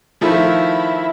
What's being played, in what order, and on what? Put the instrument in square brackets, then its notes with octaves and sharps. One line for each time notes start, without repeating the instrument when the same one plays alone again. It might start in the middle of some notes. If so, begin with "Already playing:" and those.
[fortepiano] D#3 F3 A3 [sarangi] E4